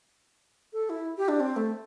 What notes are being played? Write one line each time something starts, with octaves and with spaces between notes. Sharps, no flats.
A4
E4
G4
D4
C4
A3